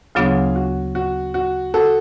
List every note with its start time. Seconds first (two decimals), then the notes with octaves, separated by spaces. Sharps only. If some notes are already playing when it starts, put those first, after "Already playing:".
0.15 D2 C#3 F#3 B3 D4 F4 G#4
0.56 F#4
0.95 F#4
1.34 F#4
1.74 F#4 A4